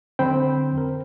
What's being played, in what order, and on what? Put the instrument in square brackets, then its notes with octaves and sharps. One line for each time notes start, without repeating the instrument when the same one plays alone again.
[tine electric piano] D3 F#3 B5 [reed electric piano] C4 C5 G5
[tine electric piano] A#4